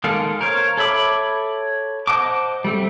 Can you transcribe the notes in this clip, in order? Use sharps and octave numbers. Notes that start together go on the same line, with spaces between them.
D#3 G#3 A#3 A4 F5
A#4 C5 C#5 F5
A4 C#5 E5 B5 D6
C5 D#5 F#5 A5 D6
G3 A3 C4